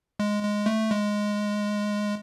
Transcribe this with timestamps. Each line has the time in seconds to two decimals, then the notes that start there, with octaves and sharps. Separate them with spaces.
0.19 G#3
0.43 G#3
0.66 A3
0.90 G#3